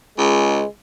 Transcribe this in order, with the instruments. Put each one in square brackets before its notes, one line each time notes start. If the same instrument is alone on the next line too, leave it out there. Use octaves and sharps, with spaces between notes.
[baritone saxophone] C#2 [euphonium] G#3